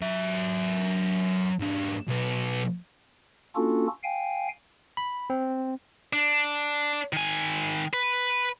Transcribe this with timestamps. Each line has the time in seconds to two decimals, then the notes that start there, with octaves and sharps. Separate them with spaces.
0.01 F#3 E5
1.59 G#2 D4
2.07 B1 B3
3.56 A#3 C#4 D4 F4 F#4 A4
4.03 F5 G5 G#5
4.97 B5
5.30 C4
6.13 D4
7.13 D#3 G#5
7.94 B4